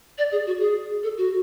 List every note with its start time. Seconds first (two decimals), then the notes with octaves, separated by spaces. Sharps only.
0.18 D5
0.32 G#4
0.47 F#4
0.61 G#4
1.03 A4
1.18 F#4